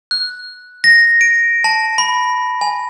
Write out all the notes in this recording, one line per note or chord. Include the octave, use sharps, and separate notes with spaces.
F#6
A#6
D7
A5
B5
G#5